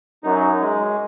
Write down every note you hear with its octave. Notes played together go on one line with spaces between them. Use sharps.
F#2 D#4
G#3